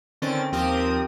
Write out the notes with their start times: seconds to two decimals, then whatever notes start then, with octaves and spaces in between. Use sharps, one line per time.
0.22 D3 D#3 C4 C#4 A6
0.52 D#2 F3 C4 G4 A#4 D#6